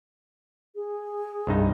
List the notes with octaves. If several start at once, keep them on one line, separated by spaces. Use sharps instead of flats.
G#4
C2 G2 D#4